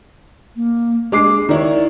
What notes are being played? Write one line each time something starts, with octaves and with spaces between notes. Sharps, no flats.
A#3
G#3 D4 D6 C7
D#3 E4 C#5 D5